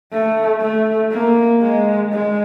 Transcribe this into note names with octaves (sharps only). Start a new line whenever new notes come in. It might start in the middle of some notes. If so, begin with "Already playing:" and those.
A3
A3
A#3
G#3
G#3